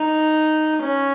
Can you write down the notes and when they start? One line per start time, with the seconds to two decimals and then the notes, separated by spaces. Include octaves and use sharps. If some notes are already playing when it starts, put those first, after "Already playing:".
Already playing: D#4
0.83 C#4